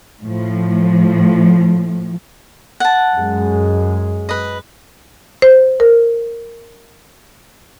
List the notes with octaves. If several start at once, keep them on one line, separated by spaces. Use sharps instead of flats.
A2 F3
F#5 A5
F#2 G#3
B4 D#5
C5
A#4